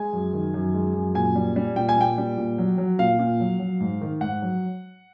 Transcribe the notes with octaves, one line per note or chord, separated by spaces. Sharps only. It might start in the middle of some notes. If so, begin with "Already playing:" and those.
Already playing: G#3 G#5
F#2
D#3
F#2
G#3
F#2
A#2 G#5
G3
G3
A#2 G5
G#5
A#2 G5
G3
A#2
F#3
F#3
A#2 F5
A#2
F#3
F#3
G#2
D#3
G#2 F#5
F#3